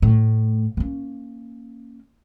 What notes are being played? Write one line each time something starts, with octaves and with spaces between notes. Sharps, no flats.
A2
A#3 C#4